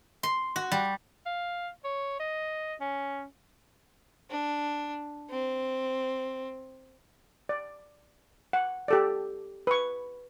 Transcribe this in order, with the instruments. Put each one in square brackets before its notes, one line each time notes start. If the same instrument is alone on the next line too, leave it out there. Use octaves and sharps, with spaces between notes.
[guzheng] C6
F#4
G3
[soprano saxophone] F5
C#5
D#5
C#4
[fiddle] D4
C4
[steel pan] D5
F#5
G4 A4 D5
B4 C#6